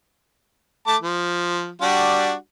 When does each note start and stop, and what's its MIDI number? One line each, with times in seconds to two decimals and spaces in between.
0.87 0.96 57
0.87 0.96 81
0.87 0.96 86
1.02 1.71 53
1.81 2.34 55
1.81 2.34 62
1.81 2.34 66